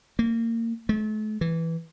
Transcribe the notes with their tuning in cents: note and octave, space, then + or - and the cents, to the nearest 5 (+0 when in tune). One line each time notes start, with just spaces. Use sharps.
A#3 -25
A3 -40
E3 -5